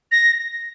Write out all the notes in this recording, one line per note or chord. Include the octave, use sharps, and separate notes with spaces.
A#6